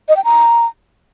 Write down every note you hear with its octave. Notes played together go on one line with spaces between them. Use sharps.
D#5
G5
A#5